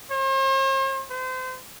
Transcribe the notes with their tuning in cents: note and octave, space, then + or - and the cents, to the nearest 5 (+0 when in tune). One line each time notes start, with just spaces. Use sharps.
C5 +45
C5 -30